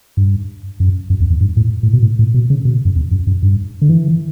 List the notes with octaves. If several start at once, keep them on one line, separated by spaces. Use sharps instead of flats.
G2
F#2
F#2
E2
E2
G2
A2
A2
B2
A2
A2
B2
C#3
B2
F#2
E2
F#2
F#2
G2
D3
E3